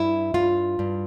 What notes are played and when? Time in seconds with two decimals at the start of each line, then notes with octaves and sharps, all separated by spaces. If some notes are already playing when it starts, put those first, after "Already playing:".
Already playing: G2 E4
0.34 G2 F4
0.79 G2